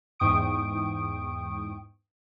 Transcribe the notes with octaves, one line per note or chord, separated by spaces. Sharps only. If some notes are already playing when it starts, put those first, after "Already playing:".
E2 G#2 G5 C#6 D#6 D7